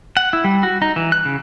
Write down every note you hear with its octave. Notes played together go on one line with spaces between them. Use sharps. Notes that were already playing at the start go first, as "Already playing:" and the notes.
F#5
E4
G3
F#4
D#4
E3
F#6
C#3